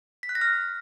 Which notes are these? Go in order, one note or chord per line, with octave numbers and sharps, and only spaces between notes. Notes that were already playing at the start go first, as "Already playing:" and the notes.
B6
F#6
A#6
F6